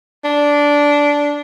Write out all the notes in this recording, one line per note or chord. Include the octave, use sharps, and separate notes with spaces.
D4